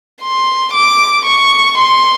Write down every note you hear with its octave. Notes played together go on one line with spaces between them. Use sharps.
C6
D6
C#6
C6